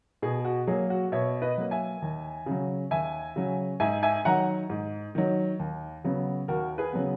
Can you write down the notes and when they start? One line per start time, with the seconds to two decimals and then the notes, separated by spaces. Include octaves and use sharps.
0.22 B2 G#4
0.45 F#4
0.67 F#3 A#3 G#4
0.90 F#4
1.12 B2 C#5 E5
1.42 B4 D#5
1.57 F#3 A#3
1.71 E5 G#5
2.02 D#2
2.46 C#3 F#3
2.91 D#2 E5 G#5
3.36 C#3 F#3
3.80 G#2 E5 G#5
4.03 E5 G#5
4.25 D#3 F#3 F#5 A#5
4.70 G#2
5.15 D#3 F#3
5.59 D#2
6.04 C#3 F#3 B3
6.48 D#2 F#4 A#4
6.78 G#4 B4
6.93 C#3 F#3 B3